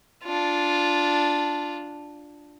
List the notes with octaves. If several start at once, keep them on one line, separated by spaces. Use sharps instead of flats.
D4 F4